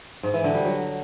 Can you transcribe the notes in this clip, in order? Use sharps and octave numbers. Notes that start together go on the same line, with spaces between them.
G#2
E3
D3
G3
F#3